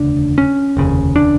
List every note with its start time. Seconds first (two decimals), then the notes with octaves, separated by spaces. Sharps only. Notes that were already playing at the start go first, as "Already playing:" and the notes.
Already playing: E1 D2 C#3 D4
0.38 C#4
0.77 F1 D#2 C#3
1.16 D4